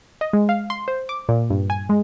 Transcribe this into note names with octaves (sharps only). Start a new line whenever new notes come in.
D#5
G#3
F5
C6
C5
D6
A#2
G2
G#5
G#3